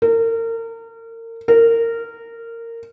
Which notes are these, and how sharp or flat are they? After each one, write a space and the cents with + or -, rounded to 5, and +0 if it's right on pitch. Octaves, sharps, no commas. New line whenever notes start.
A#4 -35
A#4 -20